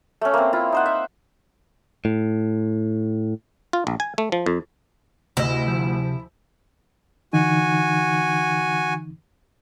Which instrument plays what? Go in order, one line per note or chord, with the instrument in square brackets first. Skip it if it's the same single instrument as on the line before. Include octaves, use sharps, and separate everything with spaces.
[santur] A3 C#4
A#3 C4
E4 F4
D#4 C5 F#5
E5
[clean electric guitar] A2
[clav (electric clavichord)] F4
A#1
G#5
A3
F3
F2
[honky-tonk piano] D2 [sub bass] C3 [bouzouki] E4 [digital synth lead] D#5
[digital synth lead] F3
[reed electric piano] D3 E3 D#4 [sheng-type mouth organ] F#4 G#5